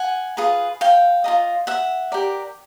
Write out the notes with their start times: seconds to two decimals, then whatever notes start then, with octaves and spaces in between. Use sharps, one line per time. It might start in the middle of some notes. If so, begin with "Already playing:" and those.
Already playing: F#5 G#5
0.37 F4 G#4 B4
0.81 F5 G5
1.24 F4 A#4 D#5
1.67 E5 F#5
2.12 G4 A#4 D5